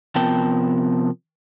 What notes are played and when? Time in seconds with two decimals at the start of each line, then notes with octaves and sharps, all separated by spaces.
0.15 C3 F3 B3 A#4 G5 A5